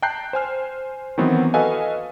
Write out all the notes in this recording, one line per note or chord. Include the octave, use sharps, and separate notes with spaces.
G5 A5 A#5 F#6 G6 C7
C5 G#5 F6
D#3 E3 F#3 B3 C4
F#4 A4 B4 D#5 F5 G#5